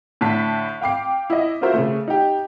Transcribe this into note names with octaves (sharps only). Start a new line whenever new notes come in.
A2 D3 A5 B6
F5 G5 D6 C7
E4 D#5
C#4 F4 F#4 A#4 C5 E5
C#3 A3
D#4 G4